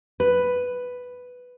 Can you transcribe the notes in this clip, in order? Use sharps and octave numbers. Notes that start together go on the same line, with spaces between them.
B4